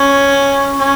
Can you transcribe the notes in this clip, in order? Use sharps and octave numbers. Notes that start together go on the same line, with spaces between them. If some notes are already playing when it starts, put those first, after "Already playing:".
Already playing: C#4
C#4